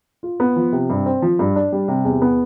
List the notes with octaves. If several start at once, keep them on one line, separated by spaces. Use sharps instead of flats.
F4
B3
F3
C3
G2
C4
F3
G2
D4
G3
C3
E2
B3